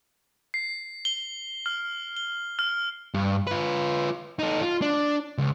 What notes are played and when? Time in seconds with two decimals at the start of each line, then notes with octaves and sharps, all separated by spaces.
0.54 C7
1.05 G7
1.66 F6
2.17 G7
2.59 F6
3.14 G2
3.47 F4 B4
4.39 D#4 A4
4.62 F4
4.82 D4
5.38 C#2